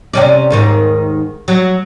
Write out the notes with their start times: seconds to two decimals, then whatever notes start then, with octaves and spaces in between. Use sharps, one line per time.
0.13 C3 C#4 D5
0.50 D#2 G#2 D#3
1.48 F#3